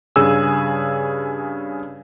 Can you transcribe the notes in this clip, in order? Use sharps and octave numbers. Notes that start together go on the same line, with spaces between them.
G2 C#3 G#4 G#5 E6